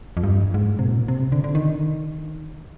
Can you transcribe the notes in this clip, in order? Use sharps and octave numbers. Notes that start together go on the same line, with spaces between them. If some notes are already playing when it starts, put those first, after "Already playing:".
F2
G2
G#2
C3
A#2
C3
D3
D3
D#3